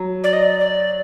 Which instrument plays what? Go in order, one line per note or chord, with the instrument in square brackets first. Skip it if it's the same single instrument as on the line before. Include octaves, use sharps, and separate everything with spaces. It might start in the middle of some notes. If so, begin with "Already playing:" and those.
Already playing: [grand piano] F#3
[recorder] D5
D#5
D5
D5